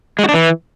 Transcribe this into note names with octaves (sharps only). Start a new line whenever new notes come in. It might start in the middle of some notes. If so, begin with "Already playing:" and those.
G#3
F#4
D4
E3